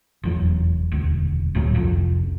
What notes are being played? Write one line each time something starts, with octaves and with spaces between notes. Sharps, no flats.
F1 E2 F#3
E1 D2
D#1 D2 A2 F#3
F1 C2 F2